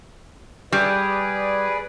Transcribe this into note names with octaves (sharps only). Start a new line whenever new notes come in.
G3 G#4 B4 D5